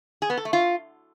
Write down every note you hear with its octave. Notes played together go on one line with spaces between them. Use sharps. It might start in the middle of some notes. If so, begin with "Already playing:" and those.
G#4
B3
A4
A3
F4